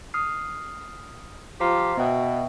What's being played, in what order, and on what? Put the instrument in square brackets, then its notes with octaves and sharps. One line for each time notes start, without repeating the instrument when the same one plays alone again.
[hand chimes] D#6 F6 C7
[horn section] F3 F4 G4 [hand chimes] C5 A#5
[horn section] B2 [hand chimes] B3 E5 G5